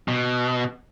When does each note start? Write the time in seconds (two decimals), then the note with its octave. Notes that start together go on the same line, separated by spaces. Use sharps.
0.08 B2